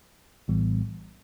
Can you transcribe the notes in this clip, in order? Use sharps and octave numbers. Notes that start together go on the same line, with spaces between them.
A#1 A2 E3 G3 B3